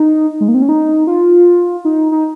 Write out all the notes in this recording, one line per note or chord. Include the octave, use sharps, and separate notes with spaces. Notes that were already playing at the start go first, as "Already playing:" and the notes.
Already playing: D#4
G#3
A#3
C4
C#4
D#4
F4
D#4
D#4